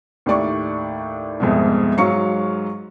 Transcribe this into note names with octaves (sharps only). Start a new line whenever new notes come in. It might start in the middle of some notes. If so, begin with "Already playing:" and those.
D#2 A2 G4 D5 C#6
C2 F2 G#2 B2
G#2 F#3 F5 C#6 C#7